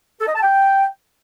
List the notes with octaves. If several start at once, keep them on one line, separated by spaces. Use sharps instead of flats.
A4
D#5
A5
G5